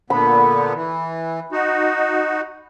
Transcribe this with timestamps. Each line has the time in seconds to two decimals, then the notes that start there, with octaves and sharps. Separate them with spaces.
0.10 A#2 D3 B3 B5
0.75 E3
1.52 D#4 F#4